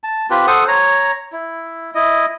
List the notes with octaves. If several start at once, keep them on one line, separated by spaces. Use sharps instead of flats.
A5
C4 F4 G4 B4
A4 C5 F#5 D#6
C#5 A#5
E4
E4 D#5